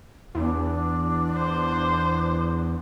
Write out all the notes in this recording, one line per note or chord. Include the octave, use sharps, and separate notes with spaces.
E2 D4
C5